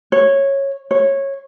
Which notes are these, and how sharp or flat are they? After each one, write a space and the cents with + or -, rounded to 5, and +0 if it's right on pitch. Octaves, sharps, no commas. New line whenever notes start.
C#5 -10
C#5 -15